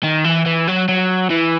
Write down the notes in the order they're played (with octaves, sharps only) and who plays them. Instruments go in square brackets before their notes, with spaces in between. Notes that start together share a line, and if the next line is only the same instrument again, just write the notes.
[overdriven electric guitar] D#3
E3
E3
F#3
F#3
E3